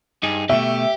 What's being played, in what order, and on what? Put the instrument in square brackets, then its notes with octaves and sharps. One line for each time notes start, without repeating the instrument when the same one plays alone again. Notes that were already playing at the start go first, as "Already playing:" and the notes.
[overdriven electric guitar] G2 [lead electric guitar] D#4 G#4
[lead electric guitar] B2 A3 [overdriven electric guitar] G4 [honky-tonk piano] E5